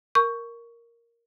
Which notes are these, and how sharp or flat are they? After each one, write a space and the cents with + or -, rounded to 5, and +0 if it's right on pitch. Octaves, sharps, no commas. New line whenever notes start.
A#4 +0 C#6 +10